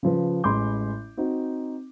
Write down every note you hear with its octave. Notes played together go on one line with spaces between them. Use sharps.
C#3 F3 B4
A1 G#3 B5 C6 D6 G6
C4 D#4 F#4